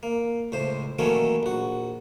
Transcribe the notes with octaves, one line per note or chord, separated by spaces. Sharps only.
A#3
C#2 A2 C5
D#3 E3 F#3 A3 A#3 C#4
A#1 F#4